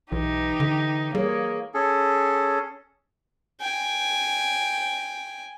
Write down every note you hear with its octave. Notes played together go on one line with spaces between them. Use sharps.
B1 E3 D#4 G4
D3
G3 A#3 G#4 C#5
C#4 G#4 A4
G5 G#5